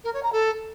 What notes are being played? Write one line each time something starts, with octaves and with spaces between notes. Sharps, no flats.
A#4
C#5
A#5
A4